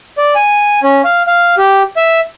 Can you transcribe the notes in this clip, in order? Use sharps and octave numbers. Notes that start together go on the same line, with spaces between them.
D5
G#5
C#4
F5
F5
G4
E5